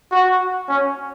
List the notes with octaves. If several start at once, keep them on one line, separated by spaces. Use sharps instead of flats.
F#4
C#4